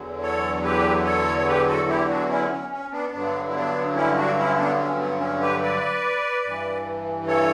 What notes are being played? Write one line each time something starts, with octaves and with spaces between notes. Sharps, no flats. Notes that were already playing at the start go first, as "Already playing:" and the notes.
Already playing: E2 D3 F#3
A4 C#5
G4 B4
A4 C#5
C#5
G4 B4
F#4 A4
E4 G4
D4 F#4
C#4 E4
C#4
C#4
B3 D4
G2 D3 F#3 B3 D4
E4
B3 D4
C#4 E4
D4 F#4
C#4 E4
B3 D4
C#4
B3
C#4
G4 B4
B4 D5
G2 E3
A4 C#5